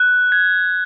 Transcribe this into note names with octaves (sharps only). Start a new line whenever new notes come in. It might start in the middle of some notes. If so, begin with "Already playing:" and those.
Already playing: F#6
G#6